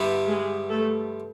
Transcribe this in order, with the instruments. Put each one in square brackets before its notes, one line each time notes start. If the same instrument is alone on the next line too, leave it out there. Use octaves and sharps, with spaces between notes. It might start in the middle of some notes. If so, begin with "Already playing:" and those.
Already playing: [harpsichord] G2 D3 G3 B3 E4
[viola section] G#3 G#4
A3 A4